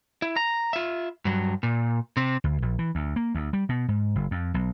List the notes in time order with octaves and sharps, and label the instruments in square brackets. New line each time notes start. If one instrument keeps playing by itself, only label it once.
[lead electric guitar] E4
A#5
F4 E5
G2 F#3
A#2
C3 C4
[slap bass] D2
A#1
E3
D2
A#3
D2
G3
B2
G#2
F#1
F2
B1